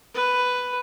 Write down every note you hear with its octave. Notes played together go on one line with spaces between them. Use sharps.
B4